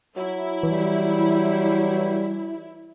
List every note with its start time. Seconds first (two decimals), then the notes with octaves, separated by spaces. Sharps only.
0.17 F#3 E4
0.63 E3 G3